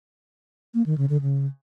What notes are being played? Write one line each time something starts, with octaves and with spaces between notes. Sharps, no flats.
A#3
D#3
C#3
D3
C#3